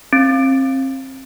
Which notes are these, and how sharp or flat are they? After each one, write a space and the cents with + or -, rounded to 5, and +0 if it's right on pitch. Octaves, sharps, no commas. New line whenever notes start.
C4 +30